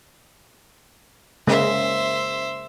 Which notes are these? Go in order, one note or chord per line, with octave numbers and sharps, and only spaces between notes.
C#3 G#3 A#3 C5 E5